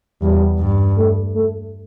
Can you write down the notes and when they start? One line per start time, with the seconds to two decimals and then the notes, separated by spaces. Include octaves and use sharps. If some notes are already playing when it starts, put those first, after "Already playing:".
0.22 E2 G3
0.59 G2
0.98 A3
1.35 A3